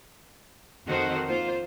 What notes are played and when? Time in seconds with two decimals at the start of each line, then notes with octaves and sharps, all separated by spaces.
0.86 F2 D#3 C4 F#4 A4 C5
1.26 A#3 F4 C5